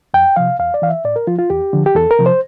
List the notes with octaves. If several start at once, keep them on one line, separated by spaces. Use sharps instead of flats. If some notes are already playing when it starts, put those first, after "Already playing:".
F2 G5
C3 F3 F5
E2 F5
D5
E3 F5
E5
A2 D5
A#4
F3 F4
F4
E2 G4
D3 F3
G4
E2 A4
A#4
C3 F3
C5